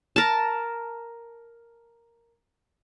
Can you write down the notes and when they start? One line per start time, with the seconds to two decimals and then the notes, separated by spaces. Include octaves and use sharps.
0.16 A#4 A5